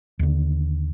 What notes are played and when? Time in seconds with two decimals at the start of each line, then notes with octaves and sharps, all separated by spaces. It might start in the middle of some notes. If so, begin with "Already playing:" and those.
0.19 D#2 D3